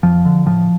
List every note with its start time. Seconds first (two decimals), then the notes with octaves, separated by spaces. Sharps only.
0.03 F2 F3
0.25 D3
0.46 A2 F3